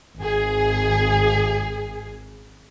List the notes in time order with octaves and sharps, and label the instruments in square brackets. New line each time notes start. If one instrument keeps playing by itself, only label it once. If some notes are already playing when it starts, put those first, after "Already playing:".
[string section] G#1 G#4